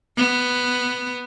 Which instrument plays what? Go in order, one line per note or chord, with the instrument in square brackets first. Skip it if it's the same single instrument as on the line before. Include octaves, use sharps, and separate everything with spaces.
[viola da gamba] B3